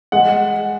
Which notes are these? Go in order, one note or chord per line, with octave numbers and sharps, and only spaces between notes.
G#3 F#5